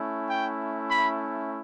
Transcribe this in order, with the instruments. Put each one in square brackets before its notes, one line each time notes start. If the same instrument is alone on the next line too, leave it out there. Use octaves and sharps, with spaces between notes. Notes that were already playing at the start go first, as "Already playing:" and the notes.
Already playing: [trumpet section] A3 C#4 E4
G5
B5